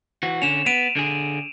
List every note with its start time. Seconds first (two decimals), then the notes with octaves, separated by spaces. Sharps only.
0.23 E3 F#4
0.42 D3 C#4 E7 F7
0.66 B3 D7 D#7 F7
0.96 D3 G#4